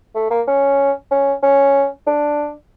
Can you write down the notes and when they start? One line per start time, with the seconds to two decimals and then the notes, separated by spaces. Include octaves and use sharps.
0.15 A3
0.31 A#3
0.48 C#4
1.11 C#4
1.43 C#4
2.07 D4